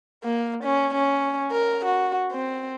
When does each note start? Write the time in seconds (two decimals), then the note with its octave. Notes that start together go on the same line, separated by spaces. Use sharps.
0.24 A#3
0.64 C#4
0.94 C#4
1.52 A#4
1.85 F#4
2.32 C4